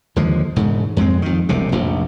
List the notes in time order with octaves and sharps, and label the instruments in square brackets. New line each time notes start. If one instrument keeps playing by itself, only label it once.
[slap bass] D#2 D3 F3 G#3
E1 G#2 C#3
F2 G#3 C4
F2 D#3
E1 C2 C3
F1 A#1